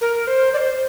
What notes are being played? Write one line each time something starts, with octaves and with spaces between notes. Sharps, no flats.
A#4
C5
D5
C5